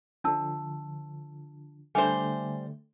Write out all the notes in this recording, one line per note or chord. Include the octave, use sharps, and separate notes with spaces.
D3 F3 D4 A5 E6
D3 G3 A3 C5 E5 G#5